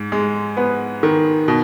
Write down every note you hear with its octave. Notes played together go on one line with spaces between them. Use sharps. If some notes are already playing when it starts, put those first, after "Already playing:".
Already playing: G#2
G#3
B3 B4
D#3
B2